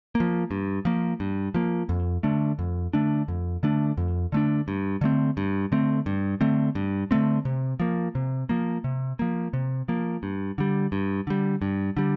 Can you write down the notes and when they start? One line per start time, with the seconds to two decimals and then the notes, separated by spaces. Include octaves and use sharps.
0.15 A#3
0.20 F3
0.51 G2
0.85 F3 A#3
1.20 G2
1.54 F3 A#3
1.89 F2
2.23 D3 A3 D4
2.59 F2
2.93 D3 A3 D4
3.28 F2
3.63 D3 A3 D4
3.97 F2
4.32 D3 A3 D4
4.68 G2
5.01 D3 A3 C4
5.37 G2
5.72 D3 A3 C4
6.06 G2
6.41 D3 A3 C4
6.75 G2
7.11 D3 A3 C4
7.45 C3
7.80 F3 A#3
8.15 C3
8.49 F3 A#3
8.84 C3
9.19 F3 A#3
9.53 C3
9.88 F3 A#3
10.23 G2
10.58 D3 G3
10.92 G2
11.27 D3 G3
11.62 G2
11.97 D3 G3